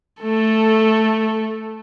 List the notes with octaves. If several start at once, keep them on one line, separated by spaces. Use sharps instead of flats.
A3 A4